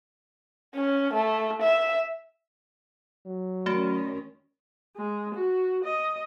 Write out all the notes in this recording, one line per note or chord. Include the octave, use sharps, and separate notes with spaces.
C#4
A3
E5
F#3
D#3 A3 C#4 F#4
G#3
F#4
D#5